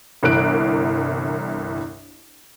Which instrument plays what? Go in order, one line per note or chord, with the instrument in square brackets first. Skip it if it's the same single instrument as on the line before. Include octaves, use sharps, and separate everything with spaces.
[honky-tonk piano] G1 C2 E3 A#4 F#6 D7